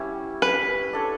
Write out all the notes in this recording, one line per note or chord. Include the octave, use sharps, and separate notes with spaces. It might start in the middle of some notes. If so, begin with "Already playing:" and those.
Already playing: G3 B3 C#4 E4
B4
D4 A4 C#5